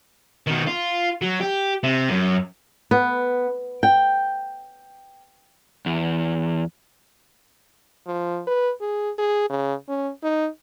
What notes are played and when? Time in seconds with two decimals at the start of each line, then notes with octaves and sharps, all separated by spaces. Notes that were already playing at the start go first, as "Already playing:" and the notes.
0.47 B2 D#3
0.67 F4
1.21 F#3
1.41 G4
1.83 C3
2.09 F#2
2.91 B3
3.83 G5
5.86 E2
8.07 F3
8.47 B4
8.81 G#4
9.18 G#4
9.50 C#3
9.89 C#4
10.23 D#4